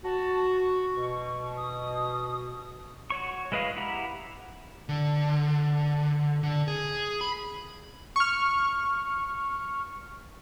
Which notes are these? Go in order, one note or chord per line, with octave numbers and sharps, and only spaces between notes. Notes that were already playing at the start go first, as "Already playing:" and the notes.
F#4 A5
C#6
B2
D#6
F#4 C#5 C#6
G#3 E4 B4 D#5 F5
E4 G4 F#5 A#5 B5
D3
D3
G#4
B5
C#6 F6